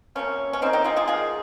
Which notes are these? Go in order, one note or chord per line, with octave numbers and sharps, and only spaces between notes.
C3 F3 A#3 C#4
C#4
D#3 G#3 C4 D#4
D#4 G4
F4 G#4
F4 G#4
D#3 G#3 F4 G#4